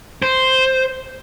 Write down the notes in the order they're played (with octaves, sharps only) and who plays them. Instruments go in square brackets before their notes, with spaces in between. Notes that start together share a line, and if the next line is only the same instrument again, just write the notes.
[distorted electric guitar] C5